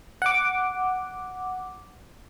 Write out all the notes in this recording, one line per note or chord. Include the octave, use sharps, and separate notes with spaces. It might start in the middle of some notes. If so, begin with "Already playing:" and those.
F#5 D6